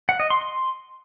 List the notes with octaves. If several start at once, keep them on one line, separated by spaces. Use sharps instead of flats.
F#5
D#5
C6
C6